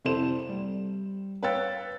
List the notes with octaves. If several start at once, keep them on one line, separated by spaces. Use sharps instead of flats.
F1 C2 E4 A4 C5 E7
G3
B4 C#5 F5 G5 E6 A6